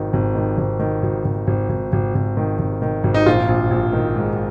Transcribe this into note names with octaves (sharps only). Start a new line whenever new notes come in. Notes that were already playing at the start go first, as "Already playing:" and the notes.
Already playing: G#1 D#3
G#1
D#3
G#1
D#3
G#1
G#1
G#1
G#1
G#1
G#1
D#3
G#1
D#3
G#1
D#4
A#1 F4
A#1
A#1
D#3
G#2